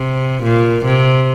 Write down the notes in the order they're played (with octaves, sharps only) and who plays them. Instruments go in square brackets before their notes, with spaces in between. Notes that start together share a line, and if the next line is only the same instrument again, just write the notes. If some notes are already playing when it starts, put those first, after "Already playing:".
Already playing: [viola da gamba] C3
A#2
C3